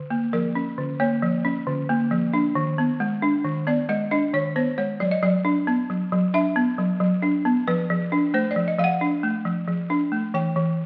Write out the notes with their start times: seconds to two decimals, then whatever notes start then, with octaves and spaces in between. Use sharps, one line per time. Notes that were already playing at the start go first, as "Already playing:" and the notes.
Already playing: D3
0.10 A#3
0.33 F3 A#4
0.55 C#4
0.78 D3
1.00 A#3 C#5
1.22 F3
1.45 C#4
1.67 D3
1.89 A#3
2.11 F3
2.33 D4
2.55 D#3
2.78 B3
3.00 G#3
3.22 D4
3.44 D#3
3.67 B3 D5
3.89 G#3 D#5
4.11 D4 D#5
4.34 D#3 C#5
4.56 B3 C5
4.78 G#3 C#5
5.00 F#3 D5
5.11 D#5
5.23 F#3 D5
5.45 D4
5.67 B3
5.90 F#3
6.12 F#3
6.34 D4 E5
6.56 B3
6.78 F#3
7.00 F#3
7.22 D4
7.45 B3
7.67 F3 B4
7.90 F3
8.12 D4
8.34 A3 C5
8.51 D5
8.56 F3
8.68 D#5
8.79 F3 F5
8.84 F#5
9.01 D4
9.23 A3
9.45 F3
9.68 F3
9.90 D4
10.12 A3
10.34 E3 G5
10.56 E3